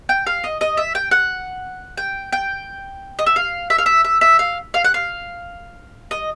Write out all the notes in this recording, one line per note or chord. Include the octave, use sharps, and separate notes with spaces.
G5
F5
D#5
D#5
E5
G5
F#5
G5
G5
D#5
E5
F5
E5
F5
E5
E5
E5
F5
F5
F#5
F5
D#5